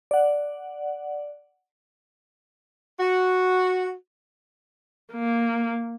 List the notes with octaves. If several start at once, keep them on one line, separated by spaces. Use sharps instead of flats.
D5 F#5
F#4
A#3